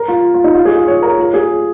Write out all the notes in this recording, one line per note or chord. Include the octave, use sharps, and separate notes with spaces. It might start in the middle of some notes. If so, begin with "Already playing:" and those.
Already playing: A#4
F4
F4
D#4
F4
G#4
F4
C#5
A#4
F4
G#4